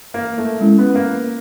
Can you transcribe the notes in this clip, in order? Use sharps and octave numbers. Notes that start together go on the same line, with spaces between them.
A#3
A3
G#3 C#4 E4
B3
A#3